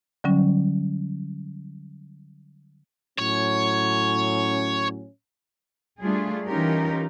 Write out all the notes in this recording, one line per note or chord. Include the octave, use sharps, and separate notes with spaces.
D3 F#3 G3 C#4
A2 F#3 C#4 C#5
G3 A3 D4 F4 G#4
E3 C#4 D#4 F4 G4 A#4